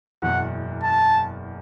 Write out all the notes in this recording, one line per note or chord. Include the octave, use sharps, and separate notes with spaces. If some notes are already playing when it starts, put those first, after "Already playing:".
F#1 E2 B2 F#5
A5